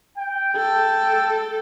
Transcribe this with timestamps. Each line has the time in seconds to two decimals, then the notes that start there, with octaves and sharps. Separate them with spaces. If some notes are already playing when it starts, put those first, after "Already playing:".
0.18 G5
0.56 A4